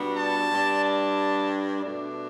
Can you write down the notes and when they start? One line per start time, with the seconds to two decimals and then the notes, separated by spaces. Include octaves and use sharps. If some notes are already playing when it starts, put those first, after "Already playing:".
Already playing: B2 G3 B3 D4
0.15 A5
0.48 G2 G3 D4
0.82 A5
1.82 B2 A3 D4